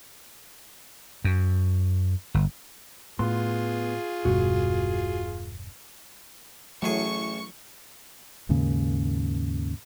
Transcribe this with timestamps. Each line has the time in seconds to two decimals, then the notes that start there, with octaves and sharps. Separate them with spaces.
1.24 F#2
2.34 G1
3.19 A2 B3 F4 G#4 C6
4.25 E1 G2 B2 F#4
6.82 A1 E3 F#3 A3 G#4 C#6
8.49 D#2 G#2 C#3 A#3